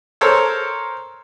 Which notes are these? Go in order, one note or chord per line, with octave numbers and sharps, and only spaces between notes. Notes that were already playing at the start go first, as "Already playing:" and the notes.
A4 A#4 C5 C#5 E6